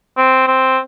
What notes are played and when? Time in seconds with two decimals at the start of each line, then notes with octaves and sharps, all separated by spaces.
0.17 C4
0.47 C4